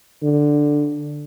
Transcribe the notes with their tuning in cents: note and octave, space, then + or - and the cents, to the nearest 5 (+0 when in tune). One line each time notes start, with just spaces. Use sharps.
D3 +5